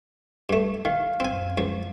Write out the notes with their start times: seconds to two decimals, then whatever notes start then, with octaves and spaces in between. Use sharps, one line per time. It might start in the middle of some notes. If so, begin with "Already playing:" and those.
0.49 G2 A3
0.85 D#3 F5
1.20 F#2 C4 G#5
1.58 C#2 F3